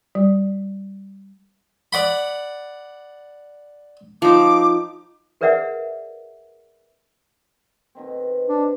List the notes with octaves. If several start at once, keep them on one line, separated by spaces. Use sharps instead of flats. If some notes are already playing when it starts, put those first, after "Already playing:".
G3
D5 F#5 B5
F3 D#4 D6
G#4 A#4 B4 D5 E5 F#5
B2 D#3 C4
D4